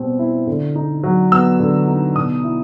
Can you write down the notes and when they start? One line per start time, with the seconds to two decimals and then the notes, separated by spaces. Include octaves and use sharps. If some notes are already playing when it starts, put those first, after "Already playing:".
Already playing: B2 G3 C4
0.19 E4
0.47 D3
0.76 D#4
1.04 F#3
1.32 B3 E6
1.60 D3
1.88 D#4
2.16 B2 D#6
2.44 E4